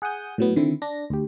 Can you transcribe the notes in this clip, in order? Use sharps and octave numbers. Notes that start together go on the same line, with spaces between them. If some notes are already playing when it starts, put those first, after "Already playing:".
G#4 F#5 G#5 D#6 G6
A2 F#3 B3
D3 D#3 C4 E4
D4 A#6
D2 G4